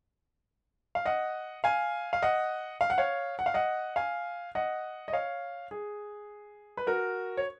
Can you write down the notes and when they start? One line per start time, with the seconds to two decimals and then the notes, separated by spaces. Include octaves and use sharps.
0.95 F5
1.06 D#5 F#5
1.64 F5 G#5
2.13 F5
2.22 D#5 F#5
2.81 F5
2.90 F#5
2.98 C#5 F5
3.39 F#5
3.46 F5
3.54 D#5 F#5
3.96 F5 G#5
4.55 D#5 F#5
5.08 D#5
5.13 C#5 F5
5.71 G#4
6.77 B4
6.87 F#4 A#4
7.37 C#5